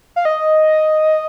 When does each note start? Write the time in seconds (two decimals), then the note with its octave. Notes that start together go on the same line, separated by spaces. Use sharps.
0.16 F5
0.25 D#5